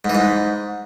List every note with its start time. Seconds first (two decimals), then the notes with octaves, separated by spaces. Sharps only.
0.05 G#2
0.10 E3
0.15 G#2